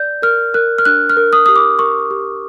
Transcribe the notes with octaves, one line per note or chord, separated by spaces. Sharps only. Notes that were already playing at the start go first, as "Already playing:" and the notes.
Already playing: D5 G6
A#4 F6
A#4 F#6
F6
D4 F#6
F6
A#4
D#6
G4 D#6
D6
A#4 C#6
G4